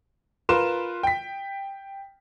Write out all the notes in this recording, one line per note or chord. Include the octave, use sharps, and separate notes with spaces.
F4 A#4 B4 C6 E7
G5 B6